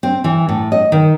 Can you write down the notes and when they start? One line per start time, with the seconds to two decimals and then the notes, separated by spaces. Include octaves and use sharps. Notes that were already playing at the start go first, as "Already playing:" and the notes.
0.03 C4
0.24 E3
0.49 A2
0.72 D#5
0.92 D#3